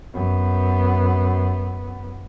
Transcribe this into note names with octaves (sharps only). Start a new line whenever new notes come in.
F#2 B3